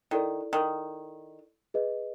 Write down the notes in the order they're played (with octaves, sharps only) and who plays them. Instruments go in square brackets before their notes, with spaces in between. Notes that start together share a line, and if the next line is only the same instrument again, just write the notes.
[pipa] D#3 [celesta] E4 A4 D5
[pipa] D#3
[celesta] G#4 B4 D#5